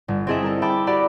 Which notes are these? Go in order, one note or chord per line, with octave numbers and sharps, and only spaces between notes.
G1
C4 E4 G#4 A4 D#5 E5
A4 A#4
E5 G5 A5 B5 D6
F#4 G4 A4 D5 B5